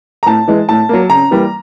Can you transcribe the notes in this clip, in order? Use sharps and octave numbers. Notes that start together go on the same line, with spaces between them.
A#5
A2 A5
E3 G#3
A2 A5
F#3 A#3
C#3 A#5
E3 G3 A#3